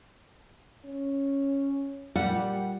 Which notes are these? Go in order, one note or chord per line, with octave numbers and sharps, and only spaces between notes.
C#4
A#2 G3 F#5